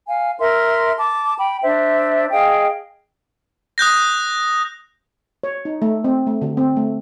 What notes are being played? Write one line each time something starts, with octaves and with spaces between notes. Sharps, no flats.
F5 G#5
A#4 E5 C6
A5 D6
G5 B5
D4 C5 E5
G#4 D#5 F5 G5
D#6 F#6 G6 A#6
C#5
D#4
A3
C4
A3
D3
C4
A3